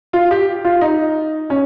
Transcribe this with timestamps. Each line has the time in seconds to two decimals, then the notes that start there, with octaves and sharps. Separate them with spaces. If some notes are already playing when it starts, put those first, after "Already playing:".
0.13 F4
0.31 G4
0.64 F4
0.81 D#4
1.50 C#4